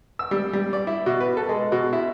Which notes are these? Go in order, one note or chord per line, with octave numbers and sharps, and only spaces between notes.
E6
G3
G3
D5
E4
B2
B4
A4
G#3
B2
E4